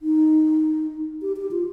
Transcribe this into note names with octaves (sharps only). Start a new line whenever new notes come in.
D#4
G4
G4
F4